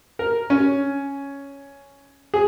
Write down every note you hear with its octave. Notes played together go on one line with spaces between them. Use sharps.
A#4
C#4
G#4